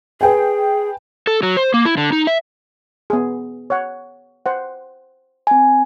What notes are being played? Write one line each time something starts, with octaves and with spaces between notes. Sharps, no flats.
G#4 B4 G5 G#5
A4
F#3
C5
A#3
E4
D3
D#4
E5
B3 G#4
C#5 F#5
C5 F#5
C4 G#5